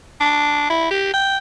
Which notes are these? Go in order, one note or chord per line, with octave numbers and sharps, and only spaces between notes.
D4
E4
G4
G5